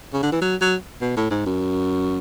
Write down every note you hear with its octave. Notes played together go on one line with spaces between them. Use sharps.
C#3
D3
E3
F#3
F#3
B2
A2
G#2
F#2